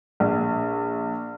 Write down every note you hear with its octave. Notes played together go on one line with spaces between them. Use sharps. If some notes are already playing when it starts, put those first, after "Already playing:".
A#1